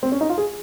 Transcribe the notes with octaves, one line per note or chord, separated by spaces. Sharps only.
C4
C#4
D#4
F4
G#4